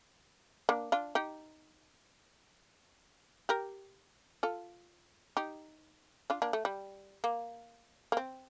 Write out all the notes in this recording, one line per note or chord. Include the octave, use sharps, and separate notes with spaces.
A#3 D4
D4 F4
D#4 G4
G4 A#4
F4 A4
D#4 G4
D4 F4
A#3 D4
A3
G3
A#3
A#3
C4